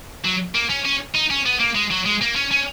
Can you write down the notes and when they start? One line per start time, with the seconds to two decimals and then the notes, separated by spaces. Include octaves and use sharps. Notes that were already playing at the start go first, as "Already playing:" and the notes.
0.25 F#3
0.55 A#3
0.70 C#4
0.85 C#4
1.15 D#4
1.30 C#4
1.46 B3
1.60 A#3
1.75 G#3
1.91 F#3
2.05 G#3
2.21 A#3
2.36 C#4
2.51 C#4